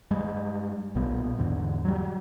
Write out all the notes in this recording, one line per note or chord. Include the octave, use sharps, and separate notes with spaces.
G2 G3 G#3
B1 A#2 G3 B3
E2 G#2 D3
F#3 G3